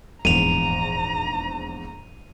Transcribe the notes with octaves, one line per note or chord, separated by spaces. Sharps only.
D#1 A#1 E2 G#2 A#5 D#7 F7